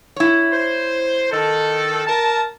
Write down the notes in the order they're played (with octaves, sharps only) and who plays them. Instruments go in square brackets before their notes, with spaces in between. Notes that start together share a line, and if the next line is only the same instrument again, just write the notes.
[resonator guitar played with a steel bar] E4 C#5
[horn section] C5
D#3 A4
A#4 A5